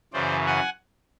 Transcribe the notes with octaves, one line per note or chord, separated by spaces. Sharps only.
F#2 C#3 E3 C5 D5
F#5 G#5